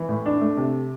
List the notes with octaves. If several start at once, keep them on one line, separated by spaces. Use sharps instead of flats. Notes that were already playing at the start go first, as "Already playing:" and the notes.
Already playing: E3
A2
D4
A3
C3